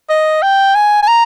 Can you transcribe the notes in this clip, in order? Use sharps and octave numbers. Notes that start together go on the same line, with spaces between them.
D#5
G5
G#5
G#5
A#5